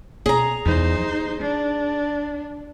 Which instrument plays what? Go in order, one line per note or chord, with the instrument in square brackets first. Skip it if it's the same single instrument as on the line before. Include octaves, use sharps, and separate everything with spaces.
[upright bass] B2 [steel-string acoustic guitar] G#4 A#5
[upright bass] E2 [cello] D#4 C5
[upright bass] D#2
[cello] D4 [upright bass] D#4